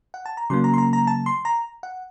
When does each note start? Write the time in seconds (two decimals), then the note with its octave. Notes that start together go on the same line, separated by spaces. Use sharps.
0.14 F#5
0.26 A5
0.37 A#5
0.50 C#3 F#3 A#3 C6
0.64 A#5
0.74 C6
0.78 A#5
0.93 A#5
1.07 A5
1.26 C6
1.45 A#5
1.83 F#5